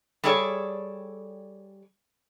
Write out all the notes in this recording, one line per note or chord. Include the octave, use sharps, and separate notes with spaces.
G3 G#4 A4 C#5 D5 A5